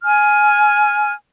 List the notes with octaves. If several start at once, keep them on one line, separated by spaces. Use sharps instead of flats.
G#5 F6